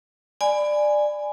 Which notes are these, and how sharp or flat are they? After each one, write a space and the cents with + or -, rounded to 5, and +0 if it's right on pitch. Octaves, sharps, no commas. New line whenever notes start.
D5 +15 G#5 +0 B5 +20